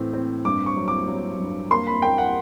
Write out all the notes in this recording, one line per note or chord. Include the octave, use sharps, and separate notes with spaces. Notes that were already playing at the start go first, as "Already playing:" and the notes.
Already playing: A2 E3 C4
C4
G2 D6
C#6
F#3
D6
F#3
G2
A#3 C6
B5
A#3 G5
F#5